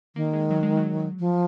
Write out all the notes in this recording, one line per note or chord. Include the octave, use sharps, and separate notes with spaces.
D#3 A#3
G#3
F#3
G#3
F#3
F3